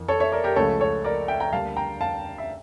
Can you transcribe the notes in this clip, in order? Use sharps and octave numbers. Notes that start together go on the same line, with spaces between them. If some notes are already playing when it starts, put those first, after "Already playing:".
Already playing: F2 E3 A#3
A4 C#5
C#5 E5
A#4 D5
G4 A#4
C#2 C#3 F3 A3 A4 C#5
A4 C#5
A#4 D5
E5 G5
G5 A#5
D2 D3 G3 A#3 F5 A5
G5 A#5
F5 A5
E5